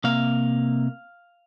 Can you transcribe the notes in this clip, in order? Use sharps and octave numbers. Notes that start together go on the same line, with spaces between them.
C3 A#3 F5